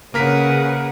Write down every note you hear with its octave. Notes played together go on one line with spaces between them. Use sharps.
C#3 A#3 A#4 B4 F#5 D#6 B6